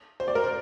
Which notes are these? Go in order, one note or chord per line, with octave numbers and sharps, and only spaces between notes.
C5
D5
A#4
C5